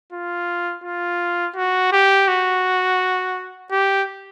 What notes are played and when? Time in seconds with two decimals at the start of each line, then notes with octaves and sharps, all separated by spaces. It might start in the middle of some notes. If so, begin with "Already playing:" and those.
0.12 F4
0.84 F4
1.56 F#4
1.92 G4
2.28 F#4
3.72 G4